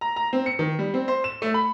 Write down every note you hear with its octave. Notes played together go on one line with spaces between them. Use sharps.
A#5
A#5
C4
C#7
D#3
G3
C4
C5
E7
A3
B5